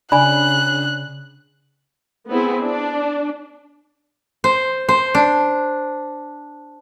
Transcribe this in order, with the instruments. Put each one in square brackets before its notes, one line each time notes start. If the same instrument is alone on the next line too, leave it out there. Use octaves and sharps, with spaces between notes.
[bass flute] C#3 [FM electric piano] D4 [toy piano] G#5 B5 [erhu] F#6
[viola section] B3 C4 E4 G#4
D4
[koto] C5
C5
D4